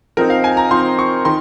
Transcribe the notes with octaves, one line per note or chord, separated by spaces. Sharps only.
F3 C4 D#4 A#4
F5
G#5
A#5
F3 C4 D#4 C6
C#6
D#3 C6